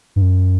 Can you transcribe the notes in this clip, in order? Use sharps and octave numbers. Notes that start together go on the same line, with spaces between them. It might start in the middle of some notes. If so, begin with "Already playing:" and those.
G2
F#2